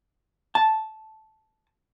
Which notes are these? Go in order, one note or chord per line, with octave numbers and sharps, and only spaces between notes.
A5